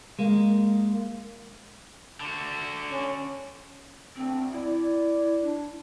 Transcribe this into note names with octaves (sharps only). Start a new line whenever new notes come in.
G#3 A#3
D3 F#4
C#4
D2 C4
E4 D5
D4